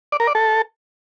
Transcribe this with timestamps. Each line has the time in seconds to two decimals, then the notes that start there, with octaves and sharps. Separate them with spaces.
0.12 D5
0.20 A#4
0.27 D5
0.35 A4